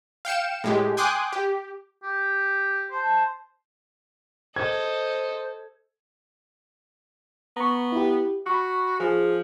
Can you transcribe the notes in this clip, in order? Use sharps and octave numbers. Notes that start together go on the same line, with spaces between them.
F5 G5 C#7 E7
A2 G#3 G4
G5 G#5 C6 D6 D#6 F#6
G4
G4
C5 A5
A4 C5 D#5 G#6
B3 A#5 C#6
E4 G4
F#4 B5 C#6
F3 G#4